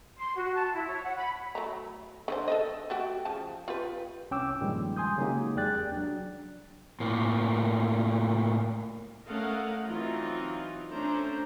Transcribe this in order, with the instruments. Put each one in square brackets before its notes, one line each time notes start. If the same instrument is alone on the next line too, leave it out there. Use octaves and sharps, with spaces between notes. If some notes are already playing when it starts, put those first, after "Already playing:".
[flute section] C6
F#4
A5
E4
C#5
F#5
B5
[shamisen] F#3 A3 A#5
D3 D#3 C5
A4 B4 D#5
A3 F#4 G4
C#3 F3 A5
F4 G4 B4
[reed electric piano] C2 C#4 G5 D6 E6
G2 A#2 D#3 F3 G3 G#3
G#5 C6 D#6 G6
C#3 F#3 G#3 A#3 D#4 G4
E2 G#4 D5 G5 F#6 A6
F#3 D4
[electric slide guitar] A2 A#3
[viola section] A3 C#4 A#4 D#5 F5 F#5
E3 F#3 C4 D#4 F4
A3 C#4 D4 C5 A#5